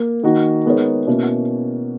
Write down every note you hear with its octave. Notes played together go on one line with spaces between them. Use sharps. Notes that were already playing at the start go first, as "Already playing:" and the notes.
Already playing: A#3
D#3 A#3 D#4 F#4
G#3 B3 D#4 A#4 C#5
B2 A#3 C#4 E4